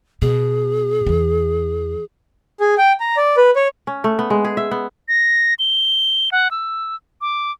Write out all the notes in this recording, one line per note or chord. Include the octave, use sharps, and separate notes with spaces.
B2 G#4
E2 E3
G#4
G5
A#5
D5
B4
C#5
C#4
A3
B3
G#3
G#4
E5
B3
A#6
G7
F#5
E6
D6